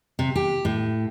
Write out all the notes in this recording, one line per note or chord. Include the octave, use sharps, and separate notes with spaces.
C3
G4
A2